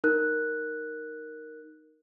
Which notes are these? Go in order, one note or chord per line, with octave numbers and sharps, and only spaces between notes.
D#4 A#4 F#6